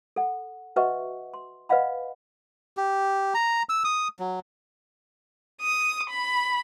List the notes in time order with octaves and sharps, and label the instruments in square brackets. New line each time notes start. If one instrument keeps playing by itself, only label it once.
[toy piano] A4 F#5
F#4 B4 D#5 E5 F#5 C#6
C6
B4 D5 D#5 F5 F#5 B5
[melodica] G4
A#5
E6
D#6
F#3
[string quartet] D#6
B5